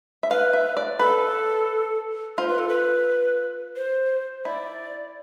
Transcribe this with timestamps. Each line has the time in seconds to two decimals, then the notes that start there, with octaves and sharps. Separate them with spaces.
0.23 E5
0.31 B4 F5
0.53 E5
0.77 D5
0.99 A4 B4
2.38 F4 C5
2.48 B4
2.58 A4
2.69 B4
3.76 C5
4.45 E4 D5